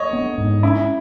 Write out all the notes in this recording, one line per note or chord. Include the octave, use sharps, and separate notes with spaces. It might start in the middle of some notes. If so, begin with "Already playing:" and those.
Already playing: C#5 D#5
B3
G#2
C#4 E4